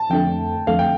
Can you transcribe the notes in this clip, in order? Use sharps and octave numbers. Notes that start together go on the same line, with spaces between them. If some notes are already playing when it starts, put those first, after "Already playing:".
Already playing: A5
F2 D3 A3 G5
F2 D3 A3 F5
G5